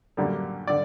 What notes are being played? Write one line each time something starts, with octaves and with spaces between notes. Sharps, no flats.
F#2 D3 G3 A#3
D3 D5